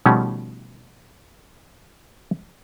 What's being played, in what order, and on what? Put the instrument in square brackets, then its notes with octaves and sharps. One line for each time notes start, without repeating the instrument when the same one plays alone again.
[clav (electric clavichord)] B2 D#3 F3 G3 A3 C#4